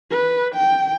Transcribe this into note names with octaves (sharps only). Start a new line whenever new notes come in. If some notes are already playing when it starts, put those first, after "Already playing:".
B4
G5